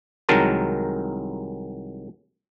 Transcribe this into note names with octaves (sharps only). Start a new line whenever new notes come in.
C2 D#3 F#3 G#3 A#4 A5